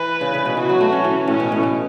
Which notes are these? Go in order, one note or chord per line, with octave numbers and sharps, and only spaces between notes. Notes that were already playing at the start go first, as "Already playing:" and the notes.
Already playing: E3 B4
C#3
C#3
B2
E3 F#4
F#3
A3
F#3 C#4
E3
A2 C#4
B2
A2
B2